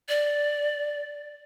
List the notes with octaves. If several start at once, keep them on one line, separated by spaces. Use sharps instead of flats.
D5